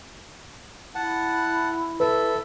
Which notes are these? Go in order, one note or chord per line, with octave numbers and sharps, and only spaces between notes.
E4 F#5 A5
A4 B4 E5